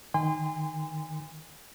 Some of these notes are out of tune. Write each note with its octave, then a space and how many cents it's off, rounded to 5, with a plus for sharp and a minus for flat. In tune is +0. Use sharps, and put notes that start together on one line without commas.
D#3 +0 G#5 -35 C6 -20